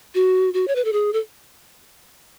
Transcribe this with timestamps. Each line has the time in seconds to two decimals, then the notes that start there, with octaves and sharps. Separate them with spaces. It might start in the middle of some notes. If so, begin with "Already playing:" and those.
0.15 F#4
0.54 F#4
0.68 C#5
0.75 B4
0.85 A4
0.93 G#4
1.13 A4